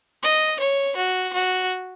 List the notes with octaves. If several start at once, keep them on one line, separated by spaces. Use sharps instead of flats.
D#5
C#5
F#4
F#4